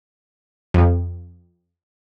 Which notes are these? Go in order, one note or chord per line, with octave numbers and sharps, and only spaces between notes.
F2